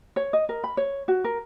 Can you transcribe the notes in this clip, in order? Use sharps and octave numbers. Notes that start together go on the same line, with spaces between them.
C#5
D#5
A#4
B5
C#5
F#4
A#4